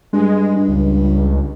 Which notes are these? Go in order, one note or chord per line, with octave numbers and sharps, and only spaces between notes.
G2 G#3
G2
C#2